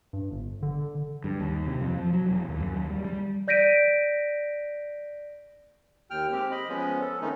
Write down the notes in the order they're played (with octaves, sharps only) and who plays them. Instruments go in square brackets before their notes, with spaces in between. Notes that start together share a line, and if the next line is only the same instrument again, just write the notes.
[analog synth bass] G2
G1
D3
[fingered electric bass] G2
D#2
C3
F2
F3
F#3
E1
D#2
F#2
D#2
G3
G3
[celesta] D5 G6 A#6 B6 D7 D#7
[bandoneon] D#2 G5 F6
G#3 C4 G4
D#5 B5
F3 G#3 B3 C#4
A4
D#3 G#3 A3 B3 C#4 D#4